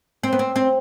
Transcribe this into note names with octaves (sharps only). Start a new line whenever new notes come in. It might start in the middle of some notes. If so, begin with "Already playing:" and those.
C4
B3
C4
C4